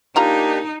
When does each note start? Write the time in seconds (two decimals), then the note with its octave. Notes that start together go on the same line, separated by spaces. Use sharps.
0.16 G3 A#3 D4 D#4 F4 G4 A#5